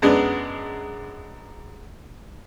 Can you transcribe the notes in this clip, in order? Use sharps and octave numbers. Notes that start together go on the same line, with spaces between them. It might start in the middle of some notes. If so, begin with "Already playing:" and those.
F#2 G#3 B3 D4